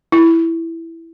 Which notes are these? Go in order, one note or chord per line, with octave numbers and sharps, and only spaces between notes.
E4